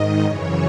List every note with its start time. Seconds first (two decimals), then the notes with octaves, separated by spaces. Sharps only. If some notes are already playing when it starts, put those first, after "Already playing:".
Already playing: G#2 D#3 D#5
0.24 F#2 C#3 E3 C#5